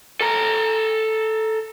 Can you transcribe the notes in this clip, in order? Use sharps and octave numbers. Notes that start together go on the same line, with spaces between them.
A4 A#5